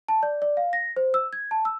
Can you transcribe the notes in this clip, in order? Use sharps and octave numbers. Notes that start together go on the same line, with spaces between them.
A5
D5
D5
F5
A#6
C5
E6
G#6
A5
E6